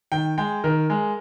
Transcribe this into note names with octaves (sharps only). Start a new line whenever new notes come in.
D#3 G5
G#3 G5
D#3 A#4
G#3